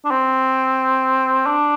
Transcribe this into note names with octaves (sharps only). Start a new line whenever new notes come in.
D4
C4
D4